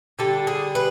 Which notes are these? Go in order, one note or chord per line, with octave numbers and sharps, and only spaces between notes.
D3 G3 A4
G#4
B4